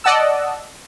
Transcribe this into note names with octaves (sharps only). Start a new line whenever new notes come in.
D5 D#5 F#5 A5 E6